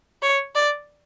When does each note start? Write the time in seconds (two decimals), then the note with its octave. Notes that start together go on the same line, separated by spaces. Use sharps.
0.22 C#5
0.55 D5